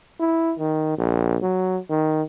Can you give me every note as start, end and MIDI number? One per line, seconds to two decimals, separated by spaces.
0.20 0.53 64
0.59 0.97 51
0.98 1.37 34
1.42 1.78 54
1.90 2.22 51